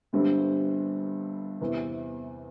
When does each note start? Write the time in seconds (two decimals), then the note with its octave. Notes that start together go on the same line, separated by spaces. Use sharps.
0.13 G1 G2 D3 G3 C4
1.61 E2 C3 E3